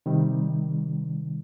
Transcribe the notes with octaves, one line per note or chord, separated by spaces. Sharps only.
C3 D#3 G3